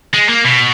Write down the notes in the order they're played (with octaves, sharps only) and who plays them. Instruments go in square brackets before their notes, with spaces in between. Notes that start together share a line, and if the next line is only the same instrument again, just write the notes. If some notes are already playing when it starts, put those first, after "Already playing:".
[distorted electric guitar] G#3
A#3
B2